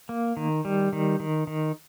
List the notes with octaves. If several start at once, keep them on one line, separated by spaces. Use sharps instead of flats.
A#3
D#3
G3
D#3
D#3
D#3